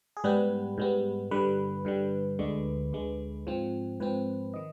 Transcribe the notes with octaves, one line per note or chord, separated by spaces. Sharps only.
G#4
G#2 G3 B3 B4
G#2 G3 B3
G2 D3 G3 B4
G2 D3 G3
D2 D3 G#3
D2 D3 G#3
G#2 F3 C4
G#2 F3 C4 B4
D#3 D#5